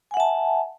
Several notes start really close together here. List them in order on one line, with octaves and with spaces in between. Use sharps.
G#5 F#5 E5 A5